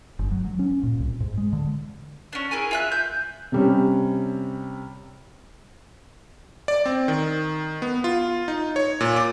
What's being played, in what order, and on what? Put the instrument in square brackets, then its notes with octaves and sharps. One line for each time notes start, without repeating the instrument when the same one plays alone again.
[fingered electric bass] G1
F#3
F#3
C#4
A#2
C2
G#2
G#3
D3
[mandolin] C#4 D4
E4 G#4 A#4 G#5
F4 E5 F#6
G6
[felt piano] C3 G3 C#4
[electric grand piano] D5
C4
D#3
B3
F4
D#4
C#5
A#2
D6